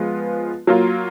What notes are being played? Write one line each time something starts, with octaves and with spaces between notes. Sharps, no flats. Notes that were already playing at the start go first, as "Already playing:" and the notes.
Already playing: F3 G#3 B3 F4
F#3 A#3 F4